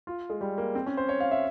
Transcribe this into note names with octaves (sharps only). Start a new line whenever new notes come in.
F4
G#3
G3
A#3
C4
C#4
C5
C#5
F5
E5